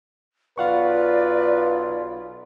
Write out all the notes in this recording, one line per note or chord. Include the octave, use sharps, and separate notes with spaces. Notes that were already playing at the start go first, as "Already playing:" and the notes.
B1 F4 B4 D5 F5 F#5 C#6